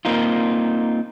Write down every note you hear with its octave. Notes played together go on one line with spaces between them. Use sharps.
A#3 C4 D#4 F4